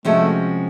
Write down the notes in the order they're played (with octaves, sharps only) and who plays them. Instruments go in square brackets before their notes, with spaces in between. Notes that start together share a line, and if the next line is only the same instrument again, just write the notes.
[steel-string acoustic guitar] C3 F3 G#3 C#4 F#4 [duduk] A3